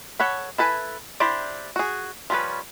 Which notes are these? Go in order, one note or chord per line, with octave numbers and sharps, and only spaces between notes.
A4 C#5 F#5 B5
E4 A4 B4 G#5
D4 E4 G4 C5 D5
F#4 G#4
F3 G3 A3 C#4 B4